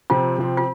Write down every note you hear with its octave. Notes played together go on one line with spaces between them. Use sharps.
C3 F3 C4 F4
C3 F3 C4
F4